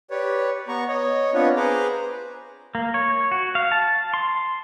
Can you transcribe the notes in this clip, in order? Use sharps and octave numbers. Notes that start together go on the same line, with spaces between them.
G4 B4 C#5 D5
B3 A#5 C#6
C#5 D#5
B3 C4 D4 F4 B4 C#5
G#4 B4 C5 A#5 D6
A#3
C#5
F#4
F5
A5
C6